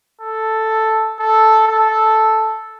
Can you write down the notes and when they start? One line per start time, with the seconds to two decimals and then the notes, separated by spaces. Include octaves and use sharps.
0.21 A4
1.19 A4
1.68 A4